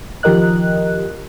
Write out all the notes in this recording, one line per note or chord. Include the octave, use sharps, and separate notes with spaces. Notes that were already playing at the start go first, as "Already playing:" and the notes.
D#3 F3 G4 A#4 D#5 F#6